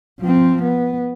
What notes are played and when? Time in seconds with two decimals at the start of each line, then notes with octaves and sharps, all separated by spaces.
0.20 F3 C4
0.63 B3